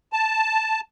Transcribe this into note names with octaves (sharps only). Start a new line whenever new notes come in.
A5